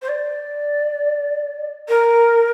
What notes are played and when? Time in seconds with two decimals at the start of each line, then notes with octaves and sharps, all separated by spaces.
0.01 C5
0.08 D5
1.88 A#4